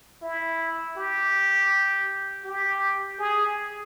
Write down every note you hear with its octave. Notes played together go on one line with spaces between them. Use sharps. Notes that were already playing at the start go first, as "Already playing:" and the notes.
E4
G4
G4
G#4